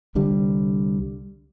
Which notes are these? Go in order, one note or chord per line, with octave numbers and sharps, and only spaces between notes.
C2 D3 G3